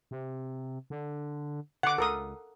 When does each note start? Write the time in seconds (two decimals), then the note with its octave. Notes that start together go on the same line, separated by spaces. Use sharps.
0.11 C3
0.90 D3
1.83 D3 F#5 D6
1.98 C#2 A4 A#4 D#6